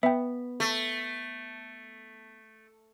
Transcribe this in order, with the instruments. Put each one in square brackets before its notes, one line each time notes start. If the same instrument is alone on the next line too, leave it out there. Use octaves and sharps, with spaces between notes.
[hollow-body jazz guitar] B3 [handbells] E5 G5
[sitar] A3